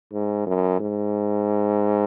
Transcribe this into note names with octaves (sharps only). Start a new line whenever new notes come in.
G#2
F#2
G#2